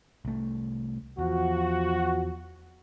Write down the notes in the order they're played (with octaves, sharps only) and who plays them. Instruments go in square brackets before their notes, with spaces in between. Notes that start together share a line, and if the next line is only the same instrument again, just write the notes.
[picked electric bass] C2 A3
[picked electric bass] E2 [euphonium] F3 [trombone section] F#4